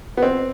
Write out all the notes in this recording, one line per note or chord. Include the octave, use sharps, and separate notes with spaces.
B3
C4